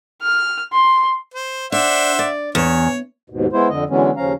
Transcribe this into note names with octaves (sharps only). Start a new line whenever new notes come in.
F6
C6
C5
D4 C5 E5 F#5
D5
E2 C#5
D#2 G#2 B2
G#3 B3 E4 C5
F2 D3 D#5
D3 E3 F#3 G#3 B3 C#4
D#2 C#3 F3 C#4 F5 A#5